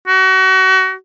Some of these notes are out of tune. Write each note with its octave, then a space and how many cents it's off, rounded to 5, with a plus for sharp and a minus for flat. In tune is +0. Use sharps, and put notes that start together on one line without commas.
F#4 +30